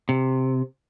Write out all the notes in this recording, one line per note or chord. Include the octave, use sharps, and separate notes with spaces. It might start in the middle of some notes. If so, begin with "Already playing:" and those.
C3